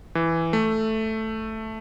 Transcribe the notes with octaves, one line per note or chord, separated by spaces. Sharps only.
E3
A3